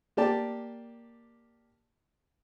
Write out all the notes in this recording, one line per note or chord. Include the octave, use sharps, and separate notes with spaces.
A#3 G4 D5 A5